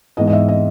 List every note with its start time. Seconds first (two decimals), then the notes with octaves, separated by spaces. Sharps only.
0.17 G#2 E3 G#3 B3 D#5
0.27 D#5
0.33 E5
0.48 D#5